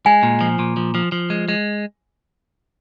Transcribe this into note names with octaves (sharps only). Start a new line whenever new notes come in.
G#3 G#5
A#2
F3
A#2
F3
F3
F3
G#3
G#3